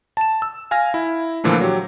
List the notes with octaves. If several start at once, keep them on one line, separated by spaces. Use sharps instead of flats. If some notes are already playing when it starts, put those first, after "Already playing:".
A5 E7
E6
F5 G#5 F6 A#6
E4
A#2 D3 E3 F3 A3
F#3 G4